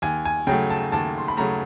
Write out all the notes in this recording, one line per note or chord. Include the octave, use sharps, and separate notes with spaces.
D#2 G#5
G#5
C#3 F#3 A3 G5
A5
D#2 A5
C6
B5
C#3 F#3 A3 A#5